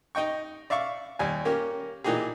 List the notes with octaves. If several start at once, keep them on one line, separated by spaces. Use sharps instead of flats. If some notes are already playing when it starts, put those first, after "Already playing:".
D#4 D#5 G5 C#6
D5 E5 F5 C#6
D#2 G3 G#5
A#3 C#4 G4 A#4
A#2 E3 A#3 D#4 G4 G#4